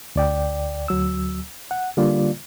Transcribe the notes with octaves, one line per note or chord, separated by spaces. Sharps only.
D2 D5 G5
D2 F#3 E6
F#5
D3 G3 A#3 F4 D5